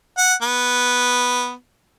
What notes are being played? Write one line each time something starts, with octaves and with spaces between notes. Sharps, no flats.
F#5
B3